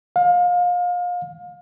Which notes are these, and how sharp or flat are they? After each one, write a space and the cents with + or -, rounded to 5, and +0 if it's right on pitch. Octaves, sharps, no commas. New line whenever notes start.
F5 +30